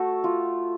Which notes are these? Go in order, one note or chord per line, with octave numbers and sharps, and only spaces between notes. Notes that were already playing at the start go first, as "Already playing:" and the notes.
Already playing: A3 F#4 A4
F4